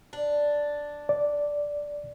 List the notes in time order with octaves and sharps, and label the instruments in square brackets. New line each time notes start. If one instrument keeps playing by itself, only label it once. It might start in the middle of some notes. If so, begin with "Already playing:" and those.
[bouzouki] D4
[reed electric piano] D5